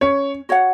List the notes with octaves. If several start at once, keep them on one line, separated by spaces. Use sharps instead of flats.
C#4 C#5
F#4 C#5 F#5